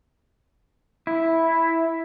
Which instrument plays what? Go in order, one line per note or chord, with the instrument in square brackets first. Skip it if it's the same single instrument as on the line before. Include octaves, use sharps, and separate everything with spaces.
[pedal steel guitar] E4